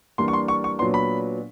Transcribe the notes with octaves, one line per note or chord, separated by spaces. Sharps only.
E3 G3 A#3 D4 C6
C#6
C6
C#6
C#6
A#2 F#3 B3 D4 C6
B5